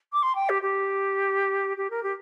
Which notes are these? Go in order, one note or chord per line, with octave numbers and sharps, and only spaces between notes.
D6
C6
G5
G4
G4
G4
A#4
G4